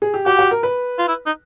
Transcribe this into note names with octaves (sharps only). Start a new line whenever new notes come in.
G#4
G4
F#4 G4
F#4
A#4
B4
F4
E4
D#4